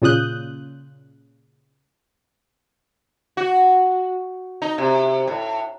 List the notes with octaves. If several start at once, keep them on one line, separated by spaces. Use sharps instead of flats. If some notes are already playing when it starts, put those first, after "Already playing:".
A#2 C#3 F4 D#6 F#6 G6
F#4
D#4
C3
A2